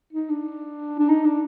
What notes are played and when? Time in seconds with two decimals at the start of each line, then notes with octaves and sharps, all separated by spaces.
0.13 D#4
0.29 D4
0.99 D4
1.09 D#4
1.24 D4